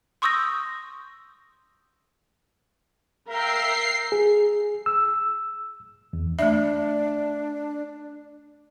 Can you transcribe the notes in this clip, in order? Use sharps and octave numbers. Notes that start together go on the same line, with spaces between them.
C6 C#6 D#6 E6 G6 A#6
A#4 E5 F5 G5 A#5 C7
G#4
E6
E2
A3 D4 E5